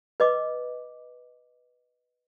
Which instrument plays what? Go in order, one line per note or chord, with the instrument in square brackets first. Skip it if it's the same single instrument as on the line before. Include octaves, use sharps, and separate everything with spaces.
[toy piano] B4 D#5 D6